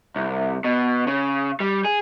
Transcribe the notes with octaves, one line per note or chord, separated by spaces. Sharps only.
C2
B2
C#3
G3
G#4